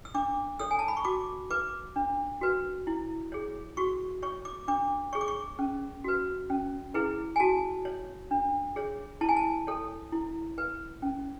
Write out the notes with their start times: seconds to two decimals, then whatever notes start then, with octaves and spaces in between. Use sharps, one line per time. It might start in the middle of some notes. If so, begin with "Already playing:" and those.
0.05 E6
0.14 D4 D6
0.59 A4 C#5 E6
0.71 G#5
0.79 A5
0.88 B5
0.97 C#6
1.05 F#4 D6
1.51 B4 D6
1.96 D4
2.41 F#4 B4
2.87 E4
3.32 G#4 C#5
3.77 F#4 C#6
4.23 C#5 C#6
4.45 D6
4.68 D4 D6
5.13 G#4 C#5 C#6
5.21 D6
5.28 C#6
5.59 C#4
6.04 F#4 B4
6.50 C#4
6.94 E4 G#4 B4
7.36 G#5
7.40 F#4 A5
7.85 C#5
8.31 D4
8.76 G#4 C#5
9.21 E4 A5
9.29 G#5
9.36 A5
9.67 A4 C#5
10.12 E4
10.58 B4
11.02 C#4